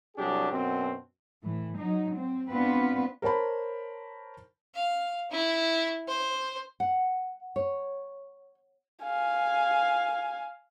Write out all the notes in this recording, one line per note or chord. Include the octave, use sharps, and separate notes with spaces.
C2 F#3 D4 G4 G#4
F#2 B2 C4
A2 E3
F#3 D#4
C4
B3 C4 D4 F4 B4
A#4 C5 C#5 A5 B5
F5
E4
C5
F#5
C#5
F5 G#5